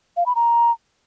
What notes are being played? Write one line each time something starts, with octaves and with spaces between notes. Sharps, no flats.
F5
B5
A#5